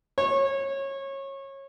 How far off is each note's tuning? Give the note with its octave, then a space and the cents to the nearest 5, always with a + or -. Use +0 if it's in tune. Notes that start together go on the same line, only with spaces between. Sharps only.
C#5 -25